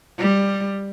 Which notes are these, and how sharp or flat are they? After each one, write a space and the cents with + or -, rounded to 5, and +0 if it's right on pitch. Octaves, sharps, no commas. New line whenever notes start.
G3 +10